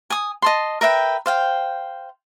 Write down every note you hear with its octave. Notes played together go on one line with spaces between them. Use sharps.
G#5 D#6
D#5 A5 C6
A#4 B4 E5 G5
C5 F5 G5